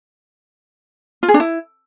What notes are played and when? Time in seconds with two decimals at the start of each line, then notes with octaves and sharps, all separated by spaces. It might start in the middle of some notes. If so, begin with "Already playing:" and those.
1.23 F4
1.28 G#4
1.34 D4
1.40 E4